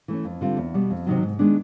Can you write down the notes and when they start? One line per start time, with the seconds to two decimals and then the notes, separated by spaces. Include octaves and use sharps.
0.08 E3 A3 C#4
0.25 F2
0.41 D3 G3 C4 F4
0.57 E2
0.74 B2 G3
0.90 F2
1.06 C3 D#3 F#3
1.23 G#2
1.39 D#3 G#3 B3 D4